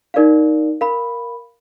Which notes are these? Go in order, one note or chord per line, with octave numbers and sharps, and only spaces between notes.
D#4 A#4 D5 F5
A#4 F5 B5